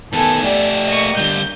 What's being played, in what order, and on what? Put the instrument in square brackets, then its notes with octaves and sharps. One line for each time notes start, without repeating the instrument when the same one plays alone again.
[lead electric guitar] D#3 B3 [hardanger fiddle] A4 G#5
[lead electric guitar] A3 G4 [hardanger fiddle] D5
[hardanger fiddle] A#3 [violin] D#5 C#6
[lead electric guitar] D3 G3 [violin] G6